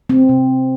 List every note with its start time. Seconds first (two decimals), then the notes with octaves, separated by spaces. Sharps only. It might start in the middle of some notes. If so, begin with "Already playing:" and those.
0.10 C3 C4
0.29 C3